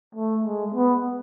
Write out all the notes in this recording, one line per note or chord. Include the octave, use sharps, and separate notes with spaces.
A3
G#3
B3